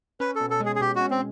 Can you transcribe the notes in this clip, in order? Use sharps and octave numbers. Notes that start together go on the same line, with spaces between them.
C#4 B4
A4
B2
A4
G#3
G#4
G#4
B2 G4
F#4
C#4
C4